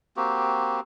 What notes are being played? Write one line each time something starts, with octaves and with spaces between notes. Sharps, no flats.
A#3 C4 F#4 G4